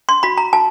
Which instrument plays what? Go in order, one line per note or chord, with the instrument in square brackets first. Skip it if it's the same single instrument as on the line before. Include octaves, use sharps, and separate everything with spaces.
[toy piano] C6
F#4 B5
A#5
F#4 A5